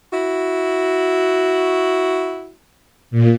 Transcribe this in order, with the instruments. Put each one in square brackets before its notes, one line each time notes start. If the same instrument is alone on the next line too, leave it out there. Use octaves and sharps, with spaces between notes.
[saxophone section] E4 F#4
[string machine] A#2